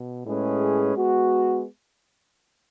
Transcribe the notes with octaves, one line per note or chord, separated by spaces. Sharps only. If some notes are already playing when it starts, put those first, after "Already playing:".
Already playing: B2
A2 G#3 C#4 G#4 B4
G#3 B3 F#4